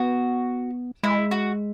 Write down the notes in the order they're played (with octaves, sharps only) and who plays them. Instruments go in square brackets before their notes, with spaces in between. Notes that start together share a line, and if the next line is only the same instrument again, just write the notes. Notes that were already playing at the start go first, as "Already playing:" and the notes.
Already playing: [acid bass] B3 [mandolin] F#4
[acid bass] G#3 [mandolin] E4
[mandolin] F#4